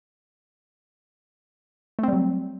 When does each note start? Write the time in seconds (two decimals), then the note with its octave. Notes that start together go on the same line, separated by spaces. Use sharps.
1.99 A3
2.03 C4
2.08 G3
2.13 F#3